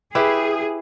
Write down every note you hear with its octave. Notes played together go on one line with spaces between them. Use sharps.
E4 G4 G#4 B4